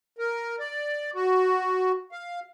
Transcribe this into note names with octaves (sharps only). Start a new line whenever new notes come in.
A#4
D5
F#4
F5